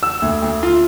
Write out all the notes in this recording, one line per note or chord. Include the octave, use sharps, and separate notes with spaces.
E6
D2
D2
F4